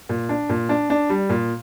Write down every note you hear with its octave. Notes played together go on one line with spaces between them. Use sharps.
A#2
D4
A#2
D4
D4
G3
A#2